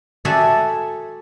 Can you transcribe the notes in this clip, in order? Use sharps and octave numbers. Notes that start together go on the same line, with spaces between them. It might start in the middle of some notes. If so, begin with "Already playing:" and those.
F#4 G#4 A4 D5 E5